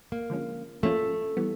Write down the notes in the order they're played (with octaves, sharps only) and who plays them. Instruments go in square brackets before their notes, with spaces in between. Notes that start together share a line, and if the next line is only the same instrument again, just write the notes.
[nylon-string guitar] A#3
[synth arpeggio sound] D3 F3 G#3 C#4
[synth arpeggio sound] F3 A#3 C#4 F4 [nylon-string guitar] A3
[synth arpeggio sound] E3 G3 B3